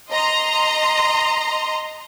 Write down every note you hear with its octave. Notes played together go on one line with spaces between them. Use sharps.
D#5 A#5 C6